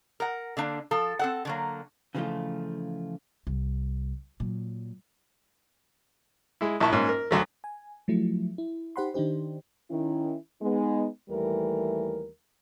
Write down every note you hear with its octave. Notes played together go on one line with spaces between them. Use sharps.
A#4 F#5
D3 A#3 D4
F3 A4
C4 A4 F#5
D3 F#3 A#3
C#3 E3 F3 A3 D#4 F4
C2
A#2 F#3
G#3 E4
A#1 E4 A5 C#6
G#2 A#3 C#4
A#4
D2 F#3 A3
G#5
F3 F#3 A3 E4
E4
D#4 G4 C5 F#5 B5 C6
D#3 D4 D#4 G4 C5
D#3 C#4 E4
G#3 B3 D#4
D#2 E3 G3 A3 A#4